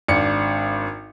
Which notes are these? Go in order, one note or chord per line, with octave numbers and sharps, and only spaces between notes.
G#1 D4 C#7